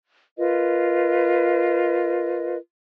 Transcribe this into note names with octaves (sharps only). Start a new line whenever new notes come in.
F4 A#4 B4 D#5